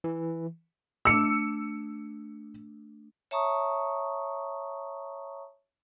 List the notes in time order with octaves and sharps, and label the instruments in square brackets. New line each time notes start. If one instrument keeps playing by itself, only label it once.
[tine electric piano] E3
[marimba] A3 D4 [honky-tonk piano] E6 C#7
[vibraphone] C#5 E5 A5 A#5 C#6 D#6